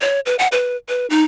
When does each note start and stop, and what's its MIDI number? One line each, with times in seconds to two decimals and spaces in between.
0.01 0.20 73
0.26 0.36 71
0.39 0.47 78
0.52 0.76 71
0.89 1.06 71
1.10 1.24 63